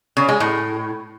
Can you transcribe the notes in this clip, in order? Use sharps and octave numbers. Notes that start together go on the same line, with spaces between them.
C#3
G#3
A2